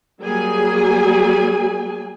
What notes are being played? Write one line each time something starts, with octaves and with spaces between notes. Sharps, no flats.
F#3 G3 A#3 G#4 G#5